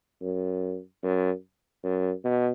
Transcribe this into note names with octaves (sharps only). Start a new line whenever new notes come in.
F#2
F#2
F#2
B2